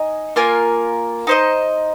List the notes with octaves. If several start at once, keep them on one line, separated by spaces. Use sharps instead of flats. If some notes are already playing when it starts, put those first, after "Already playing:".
Already playing: D#4 D#5 G#5
A#3 F4 A#4 G#5
D#4 C5 D#5